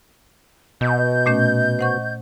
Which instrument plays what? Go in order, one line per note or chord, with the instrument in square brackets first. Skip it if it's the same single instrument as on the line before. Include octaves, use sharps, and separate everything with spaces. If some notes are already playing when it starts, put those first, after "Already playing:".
[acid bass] B2 [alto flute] D#5 [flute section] G6
[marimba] A#2 A3 C#4
C5 F#5 C#6